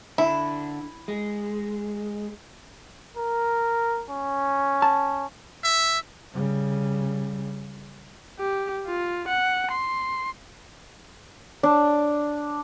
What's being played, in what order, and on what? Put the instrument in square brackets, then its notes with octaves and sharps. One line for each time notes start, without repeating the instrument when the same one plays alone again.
[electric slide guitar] D3 [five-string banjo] E4
[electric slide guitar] G#3
[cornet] A#4
C#4
[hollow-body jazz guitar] A5
[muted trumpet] E5
[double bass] C#3 G3
[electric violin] G4
F4
F#5
C6
[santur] D4